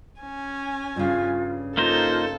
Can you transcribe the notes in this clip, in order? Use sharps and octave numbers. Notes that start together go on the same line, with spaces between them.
C#4 G#5
G2 C#3 F4
A#3 D#4 F4 A4 C5